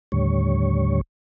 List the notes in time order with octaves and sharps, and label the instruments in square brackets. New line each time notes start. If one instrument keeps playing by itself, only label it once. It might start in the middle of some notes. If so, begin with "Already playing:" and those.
[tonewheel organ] D#2 A2 D3 G3 C#5